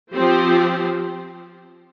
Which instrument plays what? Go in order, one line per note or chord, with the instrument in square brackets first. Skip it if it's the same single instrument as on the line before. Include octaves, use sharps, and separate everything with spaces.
[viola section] F3 C4 G4 C5